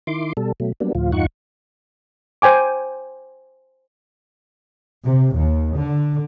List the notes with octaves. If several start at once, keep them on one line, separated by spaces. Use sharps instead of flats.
D#3 E4 C6 D6
B2 G3 A4
B2 F#3 A3
F#3 G3 A#3 B3 D4
D2 A2 F3 F4
E2 G2 D#4 F4 F#5 C#6
C5 G5 G#5 D6
C3
D#2
D3